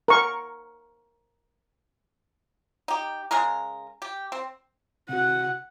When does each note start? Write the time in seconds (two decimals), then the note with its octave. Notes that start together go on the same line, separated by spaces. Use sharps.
0.08 A#4 C#6
2.88 D#4 G4
3.31 C#3 G#3 G#4 A#4
4.02 G4
4.32 C4
5.09 C3 F#4 F#5